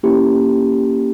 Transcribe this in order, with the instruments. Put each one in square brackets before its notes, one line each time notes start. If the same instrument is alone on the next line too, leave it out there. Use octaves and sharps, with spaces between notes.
[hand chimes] A#3 C#4 E4 G4